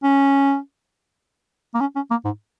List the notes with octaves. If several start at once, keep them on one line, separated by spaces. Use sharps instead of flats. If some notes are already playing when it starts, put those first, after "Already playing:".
C#4
A#3
C#4
C#4
A#3
G#2